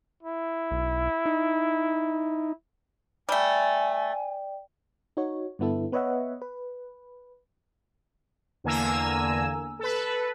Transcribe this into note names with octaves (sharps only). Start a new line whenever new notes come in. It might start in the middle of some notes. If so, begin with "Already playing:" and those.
E4
B1
D#4
G3 A3 D5 G5 G#5
D#4 F#4 C#5
G2 D3 B3 E4 A4
B3 B4 C#5 D#5 E5 F#5
B4
E2 D3 A#3 G#5 A#5 E6
A4 B4